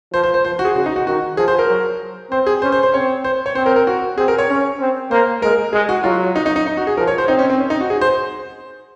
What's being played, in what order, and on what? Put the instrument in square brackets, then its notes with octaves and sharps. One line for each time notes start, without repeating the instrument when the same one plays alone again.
[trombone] F3 [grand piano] C5
[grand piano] C5
C5
[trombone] F3 [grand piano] C5
[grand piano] F#4
G#4
[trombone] C#3 [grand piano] F#4
[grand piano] D#4
F#4
[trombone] D#3 [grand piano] F#4
[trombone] F3 [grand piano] G#4
[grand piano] C5
A#4
[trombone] F#3
[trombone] C4 [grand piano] C5
[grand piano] G#4
[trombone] C#4 [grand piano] C5
[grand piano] C5
C5
[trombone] C4 [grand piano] C#5
[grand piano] C5
C#5
[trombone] C4 [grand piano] C5
[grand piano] A#4
A#4
F#4
[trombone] C4 [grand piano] G#4
[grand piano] A#4
C#5
[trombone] C#4
C4
[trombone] A#3 [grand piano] C5
[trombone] G#3 [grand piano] A#4
[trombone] G#3 [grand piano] G#4
[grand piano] F#4
[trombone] F#3 [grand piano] F4
[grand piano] D#4
D#4
D#4
D#4
F#4
G#4
[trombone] F3 [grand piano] A#4
[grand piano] C#5
C5
[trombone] C4 [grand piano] D#4
[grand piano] C#4
C4
C#4
D#4
F#4
G#4
C5